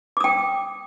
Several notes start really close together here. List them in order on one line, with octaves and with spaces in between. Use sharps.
D6 D#6 G5